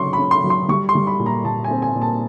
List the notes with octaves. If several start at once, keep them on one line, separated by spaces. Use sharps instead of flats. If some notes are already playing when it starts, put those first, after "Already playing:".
Already playing: C#3 F#3 C#4 C6 C#6
B5
C#4
C6
F#3
C6
G3 C#6
C6
G3
B5
A#2
A#5
A#2 A5
G#5
C4
G#5
A#2
A5